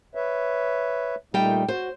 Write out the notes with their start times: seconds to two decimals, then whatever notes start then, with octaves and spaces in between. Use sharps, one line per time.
0.15 B4 C#5 E5
1.34 A#2 G3 A3 D#4 G5
1.68 F#4 C5